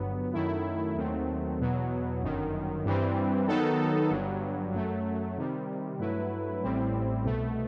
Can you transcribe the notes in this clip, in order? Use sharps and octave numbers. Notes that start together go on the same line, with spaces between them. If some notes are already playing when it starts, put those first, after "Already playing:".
Already playing: G1 G2 F#3 B3
F#2 D#3 F#3 A3 E4
D#2 D#3 F#3 A3 C4
E2 B2 F#3
G1 F#2 D#3
G2 E3 G3 C4
D#3 F#3 B3 D#4 A4
G1 G2 F#3
F#2 F#3 A3
C3 D#3 G3
G2 F#3 A3 E4 B4
A1 A2 G3 C4 E4
C2 B2 A3